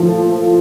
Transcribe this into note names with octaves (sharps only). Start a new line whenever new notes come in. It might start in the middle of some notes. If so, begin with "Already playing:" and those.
Already playing: A2 F3 A4